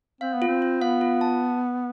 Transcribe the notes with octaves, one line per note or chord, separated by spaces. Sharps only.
C4 F5
B3
F4
C4
F4
B3 F5
F4
A5